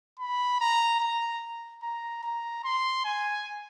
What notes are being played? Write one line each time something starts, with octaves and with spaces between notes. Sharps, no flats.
B5
A#5
A#5
A#5
A#5
C6
G#5